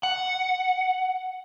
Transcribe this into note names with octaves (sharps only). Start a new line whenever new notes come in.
F#5